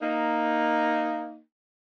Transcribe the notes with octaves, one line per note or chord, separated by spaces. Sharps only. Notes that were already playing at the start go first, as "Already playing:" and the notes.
A#3 D#4